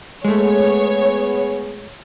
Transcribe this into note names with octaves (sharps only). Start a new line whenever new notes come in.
G#3 A3 B3 G#4 C#5